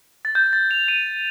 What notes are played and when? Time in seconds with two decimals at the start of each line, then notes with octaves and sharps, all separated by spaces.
0.25 A6
0.35 G6
0.53 A6
0.71 F7
0.88 D#7